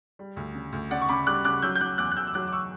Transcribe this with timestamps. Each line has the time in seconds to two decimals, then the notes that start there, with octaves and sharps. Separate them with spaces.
0.19 G3
0.37 D2
0.54 C#3
0.72 D2
0.91 C#3 D5 F#5
1.02 C#6
1.09 C#3 B5 D6
1.26 G3 D6 F#6
1.44 C#3 D6 F#6
1.62 F#3 E6 G6
1.75 G6
1.80 F#3 D6 F#6
1.98 E2 D6 F#6
2.11 F#6
2.17 E2 E6 G6
2.27 E6
2.34 F#3 D6 F#6
2.47 D6
2.52 C#6 E6